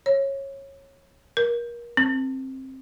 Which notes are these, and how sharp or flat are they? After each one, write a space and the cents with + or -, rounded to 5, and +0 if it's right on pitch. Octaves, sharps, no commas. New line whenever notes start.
C#5 -20
A#4 +30
C4 +15